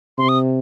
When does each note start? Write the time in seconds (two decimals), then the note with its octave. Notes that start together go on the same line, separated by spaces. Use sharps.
0.18 C3 C6
0.29 D#6